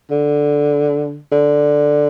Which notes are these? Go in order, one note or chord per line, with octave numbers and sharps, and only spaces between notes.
D3
D3